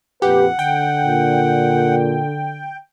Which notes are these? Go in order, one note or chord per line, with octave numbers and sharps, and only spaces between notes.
F2 A#2 G4 B4 F#5
D3 G5
A#2